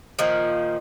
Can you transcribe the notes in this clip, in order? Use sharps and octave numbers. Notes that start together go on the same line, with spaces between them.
A#2 D#3 F3